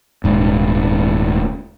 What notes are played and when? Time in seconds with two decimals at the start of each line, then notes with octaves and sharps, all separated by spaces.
0.24 D#1 G#2